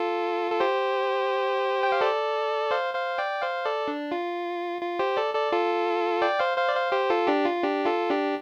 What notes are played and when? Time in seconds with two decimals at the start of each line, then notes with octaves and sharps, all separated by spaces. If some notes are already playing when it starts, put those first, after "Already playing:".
Already playing: F4 A4
0.51 A4
0.60 G4 C5
1.83 G5
1.92 F5
2.01 A4 D5
2.71 C5 F5
2.94 C5 F5
3.18 D5 G5
3.41 C5 F5
3.65 A4 D5
3.88 D4
4.12 F4
4.81 F4
4.99 G4 C5
5.17 A4 D5
5.34 A4 D5
5.52 F4 A4
6.22 D5 G5
6.39 C5 F5
6.58 C5 F5
6.69 D5
6.75 C5 F5
6.92 G4 C5
7.10 F4 A4
7.27 D4 G4
7.45 F4
7.63 D4 G4
7.86 F4 A4
8.10 D4 G4